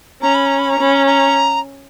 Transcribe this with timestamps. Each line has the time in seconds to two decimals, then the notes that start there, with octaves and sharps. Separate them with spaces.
0.22 C#4 A#5
0.35 B5
0.46 A#5
0.59 B5
0.71 A#5
0.79 C#4 B5
0.95 A#5
1.07 A#5